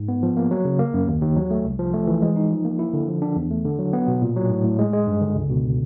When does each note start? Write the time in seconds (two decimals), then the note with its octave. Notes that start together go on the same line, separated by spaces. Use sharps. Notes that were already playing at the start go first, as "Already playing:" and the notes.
Already playing: G#2
0.08 B3
0.23 F3
0.37 A#3
0.51 F#3
0.65 C#3
0.79 A#3
0.94 F#2
1.07 D#2
1.22 D#2
1.36 F#3
1.51 A3
1.65 C2
1.79 F3
1.94 A3
2.07 E3
2.22 G#3
2.36 D#4
2.51 F3
2.65 A#3
2.79 E4
2.93 D3
3.08 F3
3.22 D4
3.36 E2
3.51 A3
3.65 D3
3.79 F#3
3.93 B3
4.08 B2
4.22 A#2
4.36 F#3
4.50 A2
4.64 A2
4.79 G#3
4.93 G#3
5.07 G2
5.21 D3
5.36 C#2
5.50 B2